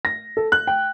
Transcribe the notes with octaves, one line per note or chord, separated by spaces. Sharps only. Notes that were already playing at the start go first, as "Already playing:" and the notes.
A#6
A4
F#6
G5